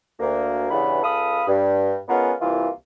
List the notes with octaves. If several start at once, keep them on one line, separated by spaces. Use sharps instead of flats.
D2 A#3
E2 G2 C#3 E3 B3 B5
C#2 A4 F5 B5 D#6
G2
G#3 B3 C#4 F4 A#4 F#5
C2 E3 A#3 E4 F4